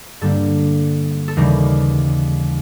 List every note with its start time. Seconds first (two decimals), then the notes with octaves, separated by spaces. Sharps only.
0.21 G2 D3 G3 A#3 A4
1.28 A4
1.37 D#2 C#3 E3 G3 A#4